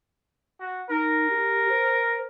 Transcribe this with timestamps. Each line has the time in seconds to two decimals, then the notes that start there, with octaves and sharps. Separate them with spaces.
0.60 F#4
0.90 D#4 A#4
1.30 G4
1.69 C5